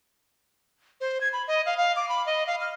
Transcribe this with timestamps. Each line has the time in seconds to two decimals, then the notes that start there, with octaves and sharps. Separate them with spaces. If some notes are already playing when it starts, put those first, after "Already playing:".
1.01 C5
1.21 G#6
1.33 B5
1.48 D#5
1.66 F5
1.77 F5
1.96 D6
2.09 B5
2.26 D#5
2.47 F5
2.61 F6